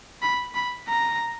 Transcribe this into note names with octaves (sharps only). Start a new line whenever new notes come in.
B5
B5
A#5